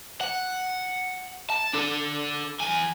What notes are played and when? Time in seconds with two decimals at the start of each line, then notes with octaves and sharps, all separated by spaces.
0.21 F#5
1.50 A5
1.74 D4 A4
2.60 E2 G#5